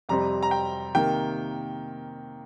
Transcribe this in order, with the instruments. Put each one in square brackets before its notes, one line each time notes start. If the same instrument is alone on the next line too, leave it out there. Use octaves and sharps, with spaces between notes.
[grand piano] F2 C3 G3 C4 A#5
A#5
G5
C3 D#3 A#3 G5